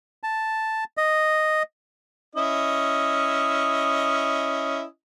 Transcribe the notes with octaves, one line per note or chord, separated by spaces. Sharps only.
A5
D#5
C#4 E4 D#5